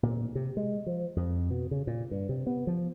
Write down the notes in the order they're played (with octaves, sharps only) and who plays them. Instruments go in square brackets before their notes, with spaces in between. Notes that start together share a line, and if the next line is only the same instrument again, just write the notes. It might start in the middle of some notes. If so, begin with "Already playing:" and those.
[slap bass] A#2
C3
G#3
F3
F2
B2
C#3
A#2
G2
C3
B3
F3